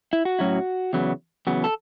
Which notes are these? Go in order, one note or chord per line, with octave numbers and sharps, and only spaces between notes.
E4
F#4
A2 F#3 C#4 E4
E2 C#3 F#3 B3
E2 C#3 F#3 B3
A4